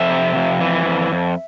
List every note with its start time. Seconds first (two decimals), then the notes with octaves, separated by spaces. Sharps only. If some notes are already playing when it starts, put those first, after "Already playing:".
Already playing: F2 E5
0.10 C3
0.36 F2
0.61 E3
0.86 F2
1.12 F2